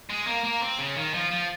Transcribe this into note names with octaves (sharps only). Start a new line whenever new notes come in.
G#3
A#3
A#3
C4
C#3
D#3
F3
F3